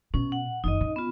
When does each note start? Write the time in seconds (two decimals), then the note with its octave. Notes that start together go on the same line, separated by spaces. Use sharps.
0.14 B2 C#4
0.32 F#5
0.64 F#1 D#3 D#4 D#5
0.81 C#3
0.96 B3 F4